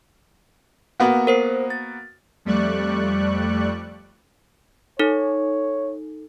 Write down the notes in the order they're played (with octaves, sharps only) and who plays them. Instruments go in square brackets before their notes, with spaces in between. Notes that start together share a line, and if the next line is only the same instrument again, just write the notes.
[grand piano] A#3 B3 F#4
[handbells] A#4 C5 C7
A6
[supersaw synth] F2 G3 A3 D5 C#6 F#6
[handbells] D#4 A4 [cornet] C#5